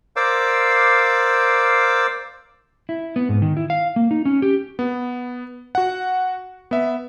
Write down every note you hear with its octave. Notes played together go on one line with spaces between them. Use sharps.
A#4 C5 D5 F5 D6 E6
E4
B3
G#2
D#3
E4
F5
A#3
D#4
C#4
G4
B3
F#4 F#5
B3 E5